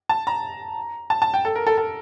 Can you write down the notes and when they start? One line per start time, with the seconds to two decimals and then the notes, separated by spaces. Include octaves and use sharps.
0.09 A5
0.27 A#5
1.10 A5
1.22 A5
1.34 G5
1.45 A4
1.55 A#4
1.67 A4
1.78 A4